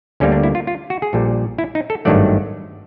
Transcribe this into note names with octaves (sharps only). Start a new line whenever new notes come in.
D2 D3 G3 A#3 C#4
D4
E4
F4
F4
F#4
G#4
A#1 A#2 G3 A4
E4
D#4
A4
G#1 G2 D#3 F#3 A3 D5